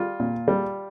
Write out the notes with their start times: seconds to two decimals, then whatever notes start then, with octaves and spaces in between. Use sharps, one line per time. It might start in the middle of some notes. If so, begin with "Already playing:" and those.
Already playing: G3 F4
0.20 A#2
0.48 G3